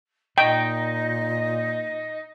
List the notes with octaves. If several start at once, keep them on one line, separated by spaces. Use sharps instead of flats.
A#2 D#4 D#5 G5